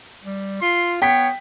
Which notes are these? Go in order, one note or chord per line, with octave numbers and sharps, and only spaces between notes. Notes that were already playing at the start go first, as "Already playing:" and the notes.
G3
F4 C6
B3 C#5 G5 B6